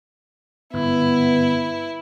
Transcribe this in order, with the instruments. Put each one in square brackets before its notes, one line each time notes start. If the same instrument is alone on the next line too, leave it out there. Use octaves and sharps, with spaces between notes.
[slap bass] G1 G#2 [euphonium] B3 [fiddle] E4